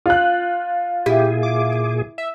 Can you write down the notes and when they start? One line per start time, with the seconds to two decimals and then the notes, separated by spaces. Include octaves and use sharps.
0.06 F4 F#6
1.06 A#2 E4 G4 G#4
1.43 D6
2.18 E5